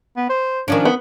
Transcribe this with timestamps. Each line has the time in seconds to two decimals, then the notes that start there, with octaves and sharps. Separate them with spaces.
0.17 B3
0.30 C5
0.68 D#3 F3 C#4 D4
0.85 B3